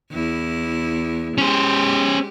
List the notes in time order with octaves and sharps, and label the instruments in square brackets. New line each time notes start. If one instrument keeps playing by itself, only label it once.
[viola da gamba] E2 E4
[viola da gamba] G#3 G4 [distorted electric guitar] C#4 C5